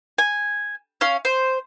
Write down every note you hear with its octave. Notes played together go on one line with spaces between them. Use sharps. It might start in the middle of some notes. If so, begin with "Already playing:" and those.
G#5
C#4 F5
C5